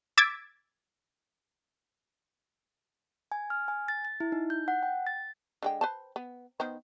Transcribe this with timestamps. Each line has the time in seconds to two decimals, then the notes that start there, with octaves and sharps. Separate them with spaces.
0.18 D6 E6 G#6 A6 B6 D7
3.32 G#5
3.50 F6
3.68 G#5
3.88 A6
4.05 A6
4.20 E4
4.32 D#4
4.50 G6
4.68 F#5
4.83 G5
5.07 A6
5.63 D3 G#3 G5
5.81 B4 C5 A5
6.16 B3
6.60 D#3 B3 C5